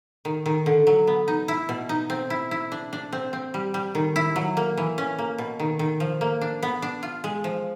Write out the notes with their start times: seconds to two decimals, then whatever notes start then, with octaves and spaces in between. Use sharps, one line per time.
0.25 D#3
0.46 D#3
0.66 D3
0.87 F#3
1.07 B3
1.28 D#4
1.48 E4
1.69 B2
1.89 D#4
2.10 C4
2.30 E4
2.51 E4
2.72 D4
2.93 D4
3.12 C4
3.33 C4
3.54 G3
3.74 G3
3.95 D#3
4.16 E4
4.36 F#3
4.57 A#3
4.77 E3
4.98 C#4
5.19 A#3
5.38 B2
5.59 D#3
5.79 D#3
6.00 F3
6.21 A#3
6.41 D4
6.63 B3
6.82 D4
7.03 F4
7.24 G#3
7.44 F3